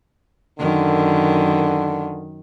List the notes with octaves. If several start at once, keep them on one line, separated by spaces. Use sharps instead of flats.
F#2 D3 D#3